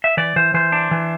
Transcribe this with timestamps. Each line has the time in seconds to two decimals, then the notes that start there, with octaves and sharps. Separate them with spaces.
0.04 E5
0.17 E3 D5
0.36 E3 C5
0.54 E3 C5
0.72 D4
0.91 E3